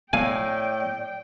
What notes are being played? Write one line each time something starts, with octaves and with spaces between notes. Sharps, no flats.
A2 D5 F5 G5 G#5